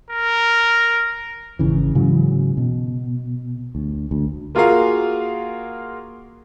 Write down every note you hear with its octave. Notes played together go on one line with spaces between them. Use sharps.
A#4
G#1 C#3 E3
G#2 C#3 E3 F#3
B2
D2
D2
A#3 F4 F#4 G#4 A#4 F5